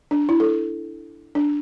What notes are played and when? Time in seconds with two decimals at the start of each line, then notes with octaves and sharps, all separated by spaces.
0.11 D4
0.29 E4
0.40 A4
1.35 D4